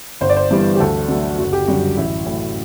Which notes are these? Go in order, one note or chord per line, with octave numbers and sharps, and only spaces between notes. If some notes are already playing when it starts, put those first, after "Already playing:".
G1 C5
D5
C5
G2 E3 G3 B3
G4
D2 A4
D3 F#3 A3
F#1 F#4
G4
F#2 D3 G3 F#4
A1 E4
A2 F#3